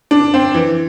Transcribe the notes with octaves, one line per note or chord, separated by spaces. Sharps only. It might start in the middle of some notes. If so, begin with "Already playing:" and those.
D4
C4
E3